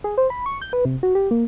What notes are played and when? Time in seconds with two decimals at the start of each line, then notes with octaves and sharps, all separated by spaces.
0.04 G#4
0.18 C5
0.30 B5
0.46 C#6
0.62 G6
0.73 B4
0.85 C3
1.03 F#4
1.15 G4
1.31 A#3